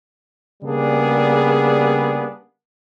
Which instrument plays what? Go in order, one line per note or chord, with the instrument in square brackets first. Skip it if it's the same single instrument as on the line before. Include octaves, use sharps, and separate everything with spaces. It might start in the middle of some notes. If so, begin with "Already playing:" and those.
[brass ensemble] C#3 G3 A#3 B3 D4 G#4